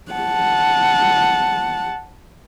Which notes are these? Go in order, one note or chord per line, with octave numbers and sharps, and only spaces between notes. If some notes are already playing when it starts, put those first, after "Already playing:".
F#5 A5